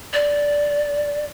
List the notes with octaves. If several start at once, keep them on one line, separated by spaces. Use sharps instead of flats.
D5